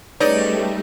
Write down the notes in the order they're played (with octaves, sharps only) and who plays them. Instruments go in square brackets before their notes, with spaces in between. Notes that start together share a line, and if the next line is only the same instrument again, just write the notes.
[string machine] G3 A3 [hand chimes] C#4 G#4 B4 [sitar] D#4 [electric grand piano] C#5 D5